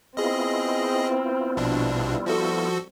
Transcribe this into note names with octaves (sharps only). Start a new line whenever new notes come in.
B3 C4 E4 F4 G#4 D#5
A#1 B2 G3 D4
F3 F#4 A4